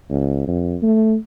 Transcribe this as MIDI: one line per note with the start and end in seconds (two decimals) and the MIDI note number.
0.10 0.45 37
0.48 0.77 41
0.82 1.17 57